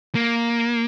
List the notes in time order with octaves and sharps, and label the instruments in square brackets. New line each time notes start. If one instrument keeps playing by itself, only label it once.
[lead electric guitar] A#3